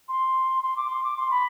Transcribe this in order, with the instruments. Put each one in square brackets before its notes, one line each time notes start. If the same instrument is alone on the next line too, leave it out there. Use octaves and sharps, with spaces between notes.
[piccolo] C6
C6
D6
C6
D6
C6
B5